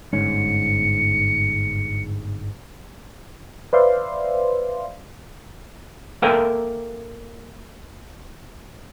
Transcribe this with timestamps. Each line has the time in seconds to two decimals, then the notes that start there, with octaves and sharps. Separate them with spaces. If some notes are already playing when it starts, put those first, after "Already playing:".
0.13 G1 G#2 C#4 C#7
3.73 B4 C5 D5 E5 F5 C6
6.22 A#3 A4 A#4 E5 G5 G#5